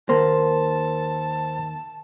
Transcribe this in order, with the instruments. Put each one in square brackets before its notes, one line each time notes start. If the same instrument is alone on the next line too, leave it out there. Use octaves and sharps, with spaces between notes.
[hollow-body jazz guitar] D#2 A#3 [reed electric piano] C5 C6 [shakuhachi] A5